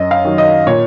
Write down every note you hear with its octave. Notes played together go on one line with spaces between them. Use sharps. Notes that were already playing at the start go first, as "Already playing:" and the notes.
Already playing: F#2 D#5
F5
D#3 F#3
D#5
A#2 C#5